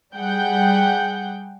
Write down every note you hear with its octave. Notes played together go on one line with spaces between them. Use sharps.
G3 G#4 F#5 G5 G6